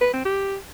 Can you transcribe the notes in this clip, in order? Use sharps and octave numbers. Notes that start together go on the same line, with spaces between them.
B4
C4
G4